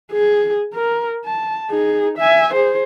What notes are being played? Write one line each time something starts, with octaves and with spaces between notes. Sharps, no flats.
G#4
A#4
A5
D#4 G#4
E5 G#5
G#4 C5